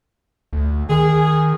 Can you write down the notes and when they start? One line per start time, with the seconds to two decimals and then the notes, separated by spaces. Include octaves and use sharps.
0.53 D2
0.90 D#3 G#4